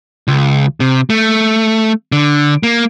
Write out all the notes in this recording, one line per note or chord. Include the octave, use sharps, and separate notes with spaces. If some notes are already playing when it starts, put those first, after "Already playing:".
C#2
C3
A3
D3
A#3